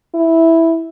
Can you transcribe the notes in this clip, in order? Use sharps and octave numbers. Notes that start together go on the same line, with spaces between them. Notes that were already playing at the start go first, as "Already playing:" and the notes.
E4